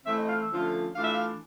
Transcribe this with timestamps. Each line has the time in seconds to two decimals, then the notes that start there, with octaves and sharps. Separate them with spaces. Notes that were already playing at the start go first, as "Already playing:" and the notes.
0.06 E3 A3 C4 E5
0.18 D#5
0.29 F5
0.39 E5
0.51 D3 F3 A3 C#4 F4
0.95 E3 A3 D4 F4 F5
1.04 E5
1.14 F5